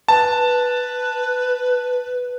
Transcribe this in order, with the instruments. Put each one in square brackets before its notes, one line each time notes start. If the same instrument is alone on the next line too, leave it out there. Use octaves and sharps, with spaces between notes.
[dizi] B4 [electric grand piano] A5